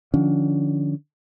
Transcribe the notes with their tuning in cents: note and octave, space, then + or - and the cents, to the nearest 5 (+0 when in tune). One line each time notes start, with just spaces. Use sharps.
D3 +30 F3 +0 C#4 +35